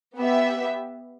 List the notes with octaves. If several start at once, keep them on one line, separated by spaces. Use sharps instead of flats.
B3 G4 E5